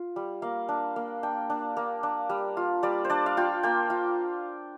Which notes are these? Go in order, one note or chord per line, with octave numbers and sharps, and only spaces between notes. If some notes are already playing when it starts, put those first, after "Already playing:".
Already playing: F4
G3
A#3 F5
D4
A#3
D4 G5
D4
A#3
D4
G3
F4
G3 D5
C5
D4 D5
F5
F4 G5
A#3 G5
F4